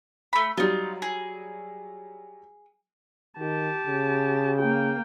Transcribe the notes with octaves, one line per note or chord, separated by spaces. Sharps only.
A3 B5
F#3 G3 D#4 F4
G#4
D#3 G4 A5
C#3
A#3 G5